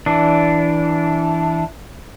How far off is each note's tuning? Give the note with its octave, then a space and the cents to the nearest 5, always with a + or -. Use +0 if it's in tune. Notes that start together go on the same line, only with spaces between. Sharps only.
E3 -5 D4 -10